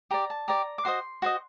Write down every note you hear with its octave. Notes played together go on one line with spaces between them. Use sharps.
G4 D5 A#5
A5
G4 D5 A#5
D6
F#4 C5 D#5 C6
F#4 C5 D#5